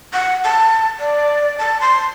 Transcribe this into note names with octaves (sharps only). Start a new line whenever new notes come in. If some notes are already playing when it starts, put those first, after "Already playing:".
F#5
A5
D5
A5
C6